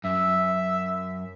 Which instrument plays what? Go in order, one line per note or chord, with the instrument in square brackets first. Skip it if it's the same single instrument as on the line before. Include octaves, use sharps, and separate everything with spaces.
[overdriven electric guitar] F#2 [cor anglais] E5